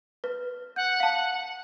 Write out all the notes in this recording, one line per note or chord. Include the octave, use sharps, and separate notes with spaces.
B4
F#5 G6
F5 A5